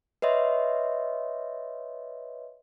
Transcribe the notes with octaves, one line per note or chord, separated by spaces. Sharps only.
B4 C#5 D#5 E5 C6